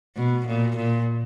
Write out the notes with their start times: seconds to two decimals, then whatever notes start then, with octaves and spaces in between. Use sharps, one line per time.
0.17 B2
0.47 A#2
0.77 A#2